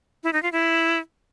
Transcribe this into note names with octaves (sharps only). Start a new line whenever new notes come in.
E4
D#4
F4
E4